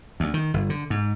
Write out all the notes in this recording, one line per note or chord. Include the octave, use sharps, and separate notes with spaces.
D2
D#3
G1
D3
G#2